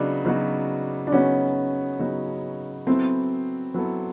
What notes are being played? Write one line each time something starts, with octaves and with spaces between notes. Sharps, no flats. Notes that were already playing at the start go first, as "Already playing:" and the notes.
Already playing: C#3 F#3 B3 D4 D#4 F#4
C#3 F#3 B3 D#4 F#4
D4
C#3 F#3 B3 C#4 D#4 F#4
C#3 F#3 B3 D#4 F#4
F#3 B3 C4 E4 A4
F#3 B3 E4 A4